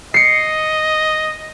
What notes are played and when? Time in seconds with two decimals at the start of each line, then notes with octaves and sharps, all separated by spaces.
0.14 D#5 C7 C#7